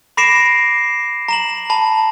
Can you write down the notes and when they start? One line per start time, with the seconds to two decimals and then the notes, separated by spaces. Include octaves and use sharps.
0.17 B5 D6 A#6 C7 D7 E7
1.28 A#5 E7 F#7
1.70 A5 B5